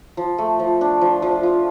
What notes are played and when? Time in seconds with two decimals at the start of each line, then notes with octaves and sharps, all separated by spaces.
0.17 F3
0.38 A3
0.60 F3
0.81 D4
1.01 F3
1.22 F3
1.43 F4